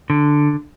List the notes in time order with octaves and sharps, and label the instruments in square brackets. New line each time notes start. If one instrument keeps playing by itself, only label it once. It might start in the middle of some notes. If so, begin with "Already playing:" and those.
[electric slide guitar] D3